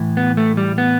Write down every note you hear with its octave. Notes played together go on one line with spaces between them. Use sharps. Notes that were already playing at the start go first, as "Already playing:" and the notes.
Already playing: A2 E3
B3
A3
G3
B3